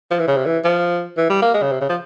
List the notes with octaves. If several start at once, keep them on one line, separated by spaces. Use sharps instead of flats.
F3
E3
C#3
C3
E3
F3
E3
G3
A#3
G#3
C#3
C3
C#3
F3